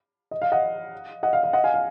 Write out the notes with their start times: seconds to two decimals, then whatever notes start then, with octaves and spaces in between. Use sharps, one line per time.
0.31 D#5
0.42 F5
0.52 D#5 F#5
1.23 D#5 F#5
1.33 F5
1.43 F5
1.53 D#5 F#5
1.64 F5 G#5
1.74 F5